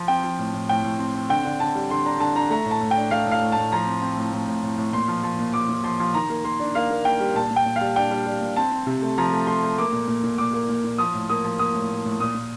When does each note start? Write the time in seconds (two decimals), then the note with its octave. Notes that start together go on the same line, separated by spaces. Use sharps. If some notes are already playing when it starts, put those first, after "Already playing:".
Already playing: F3
0.08 C4 G5
0.24 F3
0.39 A2
0.54 A2
0.69 A2 G5
0.84 A2
0.99 C4
1.15 C4
1.29 D3 G5
1.45 D3
1.60 D3 A5
1.75 G3
1.90 D3 C6
2.05 D4 A#5
2.20 D3 A5
2.35 D4 A#5
2.50 A3 A#5
2.66 A2
2.71 A5
2.81 A2
2.91 G5
2.97 D4
3.11 A3 F5
3.26 A2
3.31 F5
3.41 A2
3.52 A2 A5
3.72 F3 A#5
3.87 C4
4.02 C4
4.17 A2
4.33 A2
4.48 A2
4.63 A2
4.78 A2
4.93 A#2 C6
5.08 F3
5.23 F3
5.39 A#2
5.53 F3 D6
5.69 A#2
5.84 F3 C6
6.00 F3
6.14 D#3 A#5
6.30 A#3
6.44 A#3 C6
6.59 D4
6.75 A#3 F5
6.91 A#3
7.05 A#3 G5
7.20 G3
7.35 A#2 A5
7.51 A#2
7.56 G5
7.66 A#2
7.76 F5
7.81 G3
7.96 D4 G5
8.11 G3
8.26 G3
8.41 A#2
8.56 C4 A5
8.72 C4
8.87 C3
9.02 A3
9.18 F3 A#5
9.32 A3
9.47 A3 C6
9.63 A3
9.78 A#3 D6
9.92 A#2
10.08 A#2
10.24 A#2
10.38 A#2 D6
10.53 A#3
10.69 A#2
10.84 A#2
10.98 F3 D#6
11.14 A2
11.29 A#3 D#6
11.44 F3
11.59 A#3 D#6
11.75 A2
11.90 A2
12.05 A2
12.20 A#2 D#6
12.35 A#2